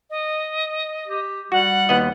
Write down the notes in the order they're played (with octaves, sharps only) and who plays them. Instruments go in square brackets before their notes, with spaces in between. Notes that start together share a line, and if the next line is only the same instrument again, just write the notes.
[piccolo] D#5
[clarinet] G4
[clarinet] G3 [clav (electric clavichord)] F#4 [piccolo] F#5
[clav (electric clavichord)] D#2 B3 D#5